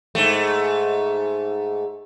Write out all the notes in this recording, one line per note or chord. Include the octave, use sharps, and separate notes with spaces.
G#2 A3